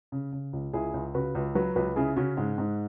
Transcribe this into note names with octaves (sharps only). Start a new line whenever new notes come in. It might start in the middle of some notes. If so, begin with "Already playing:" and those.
C#3
C#3
C#2
C#2 E4 G#4
C#2
C#3 F#4 B4
C#2
F#3 F#4 B4
C#2 F#4 B4
C#3 E4 G#4
C#3 C#4 F#4
G#2 G#3
G#2